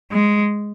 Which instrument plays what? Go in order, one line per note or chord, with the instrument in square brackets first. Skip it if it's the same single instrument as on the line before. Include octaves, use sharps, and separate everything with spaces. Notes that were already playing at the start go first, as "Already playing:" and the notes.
[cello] G#3